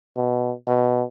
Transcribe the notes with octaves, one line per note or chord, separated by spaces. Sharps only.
B2
B2